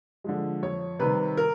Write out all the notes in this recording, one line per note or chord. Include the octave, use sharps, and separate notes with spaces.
D3 F3 G#3
F2 C#5
C3 D#3 G3 B4
A#4